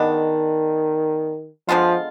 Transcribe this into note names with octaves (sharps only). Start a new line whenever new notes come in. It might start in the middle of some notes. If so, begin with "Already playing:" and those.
Already playing: B2 D#3 G#3 B3 D4
D3 F3 G#3 B3 F4